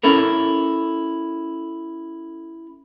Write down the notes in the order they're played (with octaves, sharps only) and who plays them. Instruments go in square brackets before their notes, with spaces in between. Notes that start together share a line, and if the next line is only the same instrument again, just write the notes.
[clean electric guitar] C#4 E4 A4 A#4